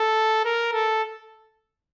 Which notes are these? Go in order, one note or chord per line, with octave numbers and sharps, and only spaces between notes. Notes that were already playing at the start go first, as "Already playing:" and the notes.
Already playing: A4
A#4
A4